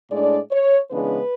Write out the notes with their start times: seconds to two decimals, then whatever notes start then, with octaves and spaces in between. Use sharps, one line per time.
0.11 A2 G#3 D4 D5
0.51 C#5
0.90 C#3 E3 G#3 B3 D4 B4